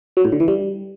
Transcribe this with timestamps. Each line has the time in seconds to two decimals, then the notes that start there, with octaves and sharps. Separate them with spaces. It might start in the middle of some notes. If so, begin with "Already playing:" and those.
0.17 F#3
0.25 A2
0.32 D3
0.40 E3
0.48 G3